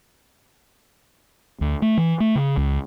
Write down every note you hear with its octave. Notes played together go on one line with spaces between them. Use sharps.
D2
A3
E3
A3
C#3
C#2